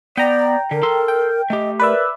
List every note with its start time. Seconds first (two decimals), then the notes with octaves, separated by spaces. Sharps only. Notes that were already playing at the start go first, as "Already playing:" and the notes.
0.17 B3 D5 G5 A#5
0.71 D3 A#4
0.83 A4 C6
1.08 G5
1.50 A3 G4 D#5
1.79 A#4 B4 D5 E5